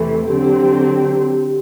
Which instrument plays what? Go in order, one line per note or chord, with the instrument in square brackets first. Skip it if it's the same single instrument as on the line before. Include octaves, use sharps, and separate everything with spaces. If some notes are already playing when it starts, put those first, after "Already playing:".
Already playing: [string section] E2 C3 E3 A3 [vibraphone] A4
[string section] D3 F#3 C4 [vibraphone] G4
[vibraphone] G4
G4
G4